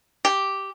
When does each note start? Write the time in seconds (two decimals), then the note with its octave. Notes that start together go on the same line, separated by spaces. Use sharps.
0.25 G4